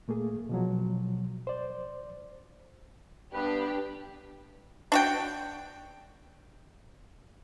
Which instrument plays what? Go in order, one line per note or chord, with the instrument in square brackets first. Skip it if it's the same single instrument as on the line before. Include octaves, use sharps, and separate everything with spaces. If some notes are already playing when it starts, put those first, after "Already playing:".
[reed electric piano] A#2 A3 A#3 G#4
B2 F3 F#3
C5 D5
[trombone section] G2 B3 B4 [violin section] D4 G4
[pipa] D4 F#4 G5